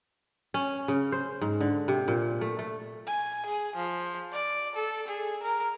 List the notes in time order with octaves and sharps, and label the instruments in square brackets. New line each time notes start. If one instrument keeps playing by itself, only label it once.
[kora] C#4
C#3
C5
G#2
D3
C3
A#2
A3
A3
[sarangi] G#5
G#4
F3
D5
A4
G#4
A#4